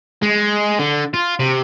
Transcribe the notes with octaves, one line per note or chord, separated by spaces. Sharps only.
G#3
D3
F4
C3